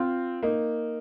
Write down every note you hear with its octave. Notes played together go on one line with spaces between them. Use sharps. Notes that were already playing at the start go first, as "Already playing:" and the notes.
Already playing: C4 F4
A#3 D#4